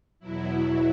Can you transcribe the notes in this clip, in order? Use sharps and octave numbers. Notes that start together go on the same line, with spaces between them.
E2 B2 F#3 E4